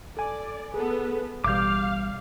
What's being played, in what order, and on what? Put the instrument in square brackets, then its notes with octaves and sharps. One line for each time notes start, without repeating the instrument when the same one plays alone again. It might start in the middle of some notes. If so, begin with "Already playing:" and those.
[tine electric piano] A4 G#5 [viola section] D5
[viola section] B3 A4 B4 [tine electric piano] G#4
[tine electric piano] A1 B2 G3 [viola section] F5 [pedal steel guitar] D6 G6